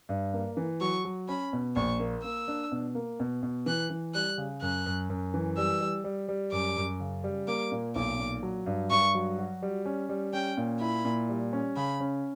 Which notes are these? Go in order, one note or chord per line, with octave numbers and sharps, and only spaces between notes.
G2
A#3
E3
F#3 C#6
F#3
C#4 B5
B2
A#1 C#6
A#3
A#3 E6
D4
B2
A#3
B2
B2
E3 F#6
E3
G3 F#6
C#3
F#2 F#6
F#2
F#2
E3
G3 E6
G3
G3
G3
F#2 D6
F#2
C#3
G3
A#3 D6
A#2
B1 D6
A#2
F#3
G2
G2 C#6
F#3
F#4
G3
C#4
G3
C#4 G5
A#2
E4 B5
A#2
G3
C#4
C#3 B5
C#4